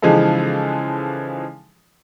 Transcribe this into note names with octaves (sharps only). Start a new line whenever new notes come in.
C#3 E3 F3 G#3 D#4 A4